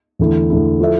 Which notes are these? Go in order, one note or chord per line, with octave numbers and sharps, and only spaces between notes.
E2 D3 A3 E4
E2 D3 A3 E4
F3 A3 E4 A4 E5